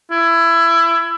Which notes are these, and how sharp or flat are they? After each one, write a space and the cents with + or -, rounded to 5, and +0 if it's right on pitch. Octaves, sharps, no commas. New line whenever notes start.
E4 +20